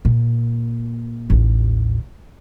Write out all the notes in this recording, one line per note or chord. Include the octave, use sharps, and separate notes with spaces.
A#2
A1 D#2